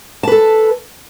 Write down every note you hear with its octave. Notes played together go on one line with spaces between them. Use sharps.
A4 B4 A5